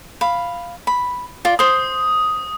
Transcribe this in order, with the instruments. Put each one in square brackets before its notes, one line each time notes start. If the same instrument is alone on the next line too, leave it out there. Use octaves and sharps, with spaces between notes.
[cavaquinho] F5 B5
B5
F4 D5
[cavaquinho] C5 C6 [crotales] D#6